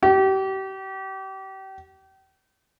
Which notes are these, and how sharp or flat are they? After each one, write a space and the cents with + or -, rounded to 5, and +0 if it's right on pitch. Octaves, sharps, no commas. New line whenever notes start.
G4 -35